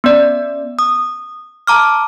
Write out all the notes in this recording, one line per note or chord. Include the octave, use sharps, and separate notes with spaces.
B3 C#4 D5
D#6
A5 A#5 D6 F6